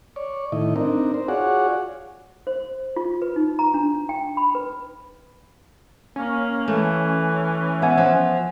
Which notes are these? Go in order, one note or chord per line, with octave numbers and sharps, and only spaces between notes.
C#5 D5
A2 D#3 E4 D#5
C4 D4 D#4 A#4
C5
F4 F#4 G#4 C#5 D5 F#5
C5
F4
B4
D#4
A#5
D4
G5
B5
B4
A#3 C#4
E3 A3
B3 E5 F#5 G#5
F3